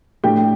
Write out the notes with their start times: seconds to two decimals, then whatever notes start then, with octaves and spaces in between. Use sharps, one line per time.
0.24 A2 A3 D4 G4 G5